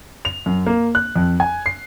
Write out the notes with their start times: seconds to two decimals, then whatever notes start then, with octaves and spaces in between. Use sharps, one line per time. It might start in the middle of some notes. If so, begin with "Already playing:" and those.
0.25 F7
0.46 F#2
0.67 A#3
0.95 F#6
1.16 F2
1.40 G#5
1.66 C7